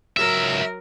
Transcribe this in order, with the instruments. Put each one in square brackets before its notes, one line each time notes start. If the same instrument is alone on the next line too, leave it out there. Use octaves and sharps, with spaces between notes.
[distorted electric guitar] C#2 E5 [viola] F#3 A#4